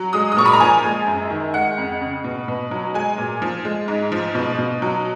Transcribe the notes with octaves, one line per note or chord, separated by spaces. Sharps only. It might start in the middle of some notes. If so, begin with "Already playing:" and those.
Already playing: F#3
G#3 D#6
D#6
A#2 C#6
B5
A#5
F3 G#5
G#3
F#2
D#3
G#3 F#5
F2
C#3
B2
B2
F#3
G#3 G#5
A#2
F3
G#3
G#2
F3
B2
B2
F#3